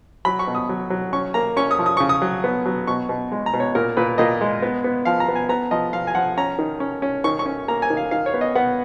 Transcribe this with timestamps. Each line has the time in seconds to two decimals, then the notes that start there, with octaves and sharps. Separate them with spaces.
0.25 F#3 B5
0.39 C#6
0.48 B2
0.55 D#6
0.69 F#3
0.90 F#3
1.13 C#4 C#6
1.34 A#3 A#5
1.57 C#4 C#6
1.71 D#6
1.79 F3
1.86 D#6
1.97 C#3 C#6
2.09 D#6
2.22 F#3
2.44 B3
2.66 F#3
2.87 B2 C#6
3.09 B2
3.32 G#3
3.46 A#5
3.54 B2
3.60 C#5
3.75 A#2 A#4
3.97 A#2 B4
4.18 A#2 D#5
4.41 G#3
4.62 B3
4.84 B3
5.05 F3 F5
5.20 A#5
5.28 B3
5.35 G#5
5.49 B3 A#5
5.71 F3 D#5
5.93 F3 F5
6.07 G#5
6.15 F3 F#5
6.37 C#4 A#5
6.59 D#3
6.80 C#4
7.02 C#4
7.24 D#3 C#6
7.39 C#6
7.46 C#4
7.68 A#3 A#5
7.82 G#5
7.90 D#3
7.97 F5
8.11 D#3 F5
8.26 C#5
8.34 B3
8.41 D#5
8.55 B3 F#5